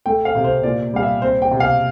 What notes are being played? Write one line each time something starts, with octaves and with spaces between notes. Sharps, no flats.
A3 G5
F5
C3
C5
A#2 D5
G3 F5
E5
C4 C5
G5
C3
F5